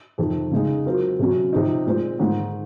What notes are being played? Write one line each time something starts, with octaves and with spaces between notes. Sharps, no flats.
F2 C3 D#3
C#3 G#3 D#4 G#4
F#3 C4 F4 A#4
C3 F#3 C#4
C3 F3 C4 D#4
A#2 G#3 C4
G#2 D#3 G#3